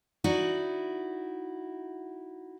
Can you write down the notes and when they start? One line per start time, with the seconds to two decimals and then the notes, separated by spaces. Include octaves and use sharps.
0.24 D#4 E4 F#4 D5